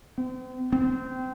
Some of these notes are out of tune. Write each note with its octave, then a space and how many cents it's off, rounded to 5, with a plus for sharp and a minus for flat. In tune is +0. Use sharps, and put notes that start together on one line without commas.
C4 -40
C4 -20